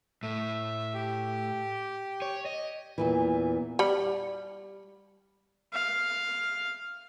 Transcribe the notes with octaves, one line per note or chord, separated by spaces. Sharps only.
A2 E5
G4
C#5
D#5
E2 A#2 E3
G3 B5
F5